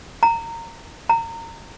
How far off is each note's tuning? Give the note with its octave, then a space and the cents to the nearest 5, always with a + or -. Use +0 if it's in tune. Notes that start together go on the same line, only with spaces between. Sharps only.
A#5 -20
A#5 -25